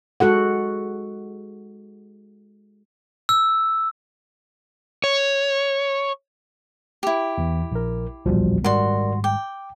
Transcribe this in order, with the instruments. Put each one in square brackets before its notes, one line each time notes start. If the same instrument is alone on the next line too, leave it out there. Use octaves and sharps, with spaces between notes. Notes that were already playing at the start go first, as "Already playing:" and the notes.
[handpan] G#3 F#4 A4 F#5
[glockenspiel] E6
[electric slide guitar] C#5
[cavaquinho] E4 G4
[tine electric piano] E2 E3
A#1 A#4
[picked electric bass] D1 A#1 E2 [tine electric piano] F3 G3 F#4
[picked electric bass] G#1 G#2 G3 [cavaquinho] F#4 C6 [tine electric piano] A#4 D5
[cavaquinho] G5 [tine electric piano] D6